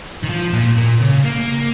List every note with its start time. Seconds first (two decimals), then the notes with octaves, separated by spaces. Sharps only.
0.24 D#3
0.30 F3
0.53 A#2
0.78 A#2
1.02 C#3
1.25 A#3